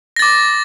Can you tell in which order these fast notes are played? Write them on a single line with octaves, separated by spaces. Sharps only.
A#6 A6 D6